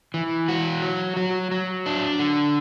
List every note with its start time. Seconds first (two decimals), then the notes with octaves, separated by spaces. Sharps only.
0.14 E3
0.48 F#4
0.82 F#3
1.17 F#3
1.51 F#3
1.86 D4
2.19 D3